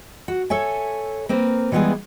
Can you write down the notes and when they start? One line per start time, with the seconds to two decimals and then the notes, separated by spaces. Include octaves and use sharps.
0.28 F#4
0.50 A4 C#5 E5 G#5
1.29 A#3 C4 A#4 B4
1.72 E3 G3 G#3 B3 E4 G#4